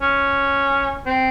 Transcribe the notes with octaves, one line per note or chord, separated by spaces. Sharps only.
C#4
C4